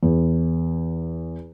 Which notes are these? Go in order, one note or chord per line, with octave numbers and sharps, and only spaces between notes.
E2